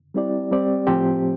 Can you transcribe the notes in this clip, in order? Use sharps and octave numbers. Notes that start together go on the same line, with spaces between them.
G3 C4 E4 G4 D5
G3 C4 G4 D5
A2 F3 C4 G4 C5